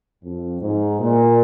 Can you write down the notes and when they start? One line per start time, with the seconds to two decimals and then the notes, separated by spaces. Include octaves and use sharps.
0.23 F2
0.61 G#2
1.00 A#2